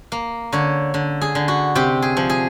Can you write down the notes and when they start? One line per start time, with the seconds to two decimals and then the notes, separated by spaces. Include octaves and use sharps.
0.12 A#3
0.52 D3 C#5
0.94 D3
1.21 G#4
1.35 D3
1.48 F#4
1.75 C3 G4
2.02 G#4
2.17 F3
2.30 G#4